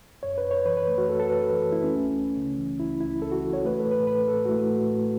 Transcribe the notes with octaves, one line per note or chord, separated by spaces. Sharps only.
F#2 C#5
B4
F#2
C#5
E3 B4
B4
A3 B4
F#4
F#2 A4
A4
F#2 B4
E3
A4
A3 E4
C#4
C#2
C#2
C#3
E3
C#2 E4
C#2 E4
C#3 A4
F#4
E3
C#5
A3 B4
A4
A2
B4
A3 B4
A2 A4
F#4
A3 E4
A2
A3